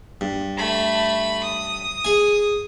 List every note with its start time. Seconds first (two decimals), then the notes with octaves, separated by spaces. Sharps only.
0.21 G2
0.57 A3 B5
1.44 D#6
2.05 G#4 G#5